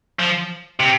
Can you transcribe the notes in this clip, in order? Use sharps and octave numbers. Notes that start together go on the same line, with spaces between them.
F3
C3